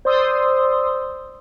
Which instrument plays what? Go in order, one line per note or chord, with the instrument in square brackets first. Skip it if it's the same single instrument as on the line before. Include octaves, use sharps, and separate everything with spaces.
[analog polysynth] C5 D5 C6 D#6 E6